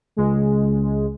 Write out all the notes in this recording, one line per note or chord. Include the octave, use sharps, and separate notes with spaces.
C#2 G#3